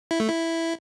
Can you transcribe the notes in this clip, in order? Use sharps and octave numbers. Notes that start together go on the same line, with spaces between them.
E4
A3
E4